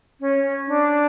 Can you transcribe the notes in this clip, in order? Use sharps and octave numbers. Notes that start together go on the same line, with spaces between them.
C#4
D4